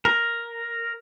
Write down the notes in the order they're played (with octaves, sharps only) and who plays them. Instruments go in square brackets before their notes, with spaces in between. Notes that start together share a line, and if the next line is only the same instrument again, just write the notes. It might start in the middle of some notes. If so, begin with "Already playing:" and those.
[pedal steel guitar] A#4